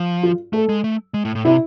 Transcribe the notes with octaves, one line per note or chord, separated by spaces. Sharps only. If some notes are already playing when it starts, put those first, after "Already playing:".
Already playing: F3
F4
A3 A4
G#3
A3
G#3
A2
A2
C3 E4